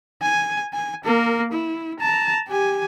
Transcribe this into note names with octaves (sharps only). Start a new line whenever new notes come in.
G#5
G#5
A#3 A#4
E4
A5 A#5
G4 G#5